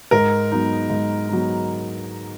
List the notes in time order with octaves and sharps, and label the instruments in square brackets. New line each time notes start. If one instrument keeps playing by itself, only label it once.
[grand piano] G#2 [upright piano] A#4
[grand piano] F#3 B3 D#4
G#2
F#3 B3 D#4